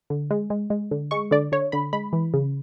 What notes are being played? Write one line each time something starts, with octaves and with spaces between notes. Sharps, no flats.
D3
G#3
G#3
G#3
D3
G#3 C#6
D3 D5
D3 C#5
D3 B5
G#3 B5
E3
C#3